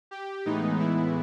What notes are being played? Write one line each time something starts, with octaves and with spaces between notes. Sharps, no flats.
G4
A2 E3 G#3 B3 D#4
E4